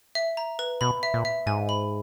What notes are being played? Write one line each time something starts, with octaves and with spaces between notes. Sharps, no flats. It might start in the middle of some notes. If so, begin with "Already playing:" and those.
E5
A#5
B4
B2 B5
E5
A#2
E5
G#2 G#5
B5